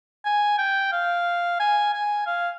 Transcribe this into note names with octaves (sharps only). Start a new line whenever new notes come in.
G#5
G5
F5
G#5
G#5
F5